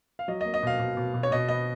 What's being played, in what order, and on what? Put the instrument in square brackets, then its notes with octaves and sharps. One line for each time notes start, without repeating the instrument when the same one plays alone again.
[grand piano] F5
F#3 D#5
A#3 D#5
D#5
B2 F5
B2
B2
B2
C#5
B2 D#5
B3 D#5